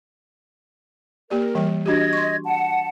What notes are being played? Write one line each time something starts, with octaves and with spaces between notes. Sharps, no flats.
A#3 G4 A#4 D5
E3 G3 G5
D4 F#4 G4 D#5 G#6
C6 C#6
F#5 A5